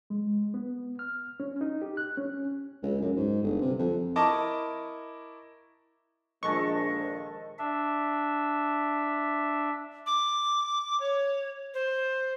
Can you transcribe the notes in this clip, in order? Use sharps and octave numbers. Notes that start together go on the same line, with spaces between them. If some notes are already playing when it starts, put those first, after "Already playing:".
G#3
B3
F6
C#4
D#4
G4
F#6
C#4
C#2
F#2
G#2
G1
C3
F2
E4 A#4 D#5 A5 C#6 D6
A#1 D#3 G#3 A4 D#5 C#6
D4 E5
D6
C#5
C5